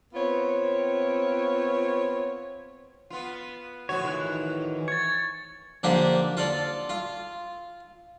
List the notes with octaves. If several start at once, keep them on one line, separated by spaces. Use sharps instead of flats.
B3 C4 F4 C#5
B3 F4
A2 F3 F#4 C#5
D#3 E3 F#6
C#6 G#6 A6
D3 F3 A#3 D4 G4
F4 A4 D5
F4